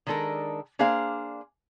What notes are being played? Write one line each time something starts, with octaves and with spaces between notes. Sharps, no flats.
D#3 G#3 D4 A4 A#4
A#3 D4 G#4 C5 F5